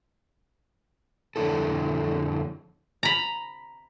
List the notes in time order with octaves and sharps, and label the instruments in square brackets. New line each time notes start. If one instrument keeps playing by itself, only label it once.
[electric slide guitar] F2 D3 E4 A4
[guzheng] A#5 B5